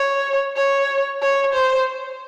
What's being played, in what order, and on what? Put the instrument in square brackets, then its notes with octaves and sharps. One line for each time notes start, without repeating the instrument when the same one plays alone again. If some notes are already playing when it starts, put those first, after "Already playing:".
Already playing: [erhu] C#5
C#5
C#5
C5